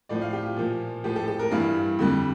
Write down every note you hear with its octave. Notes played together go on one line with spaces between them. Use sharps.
A2 F3 D5
F5
G4
F4
A#2 F3
A2 F3 G4
A4
A4
A#4
G2 E3 G3 F5
F2 D3 G3